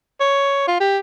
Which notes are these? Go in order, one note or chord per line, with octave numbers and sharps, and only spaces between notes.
C#5
F4
G4